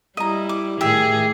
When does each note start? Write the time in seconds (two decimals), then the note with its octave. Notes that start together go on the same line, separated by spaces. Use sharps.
0.17 G3 E4 D#5 A#5
0.49 D6
0.81 A2 D#3 G4 G#4 E5